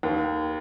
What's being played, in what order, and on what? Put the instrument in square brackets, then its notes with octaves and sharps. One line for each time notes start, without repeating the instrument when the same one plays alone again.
[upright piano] D#2